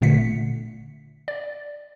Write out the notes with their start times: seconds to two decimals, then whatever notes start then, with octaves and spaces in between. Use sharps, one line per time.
0.01 G#1 A#2 D3 A3 B6 C#7
1.28 D5